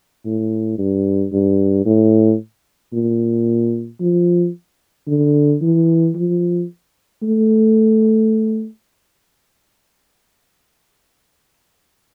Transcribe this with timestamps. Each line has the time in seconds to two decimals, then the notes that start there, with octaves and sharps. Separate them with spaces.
0.25 A2
0.78 G2
1.32 G2
1.86 A2
2.93 A#2
4.00 F3
5.08 D3
5.62 E3
6.16 F3
7.22 A3